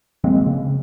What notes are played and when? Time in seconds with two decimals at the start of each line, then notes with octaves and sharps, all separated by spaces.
0.24 F#3 G#3 A#3 C4
0.46 C#3